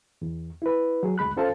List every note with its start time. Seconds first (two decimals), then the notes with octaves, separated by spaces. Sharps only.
0.22 E2
0.62 E4 B4
1.03 F#3 G#4
1.18 D2 G#3 B5 F#6
1.37 C#4 F4 A4 C5 F5 A5